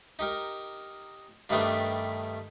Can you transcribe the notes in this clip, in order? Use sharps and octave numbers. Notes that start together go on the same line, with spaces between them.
D#4 G4 A#4
G2 D#3 G3 A3 B3 D4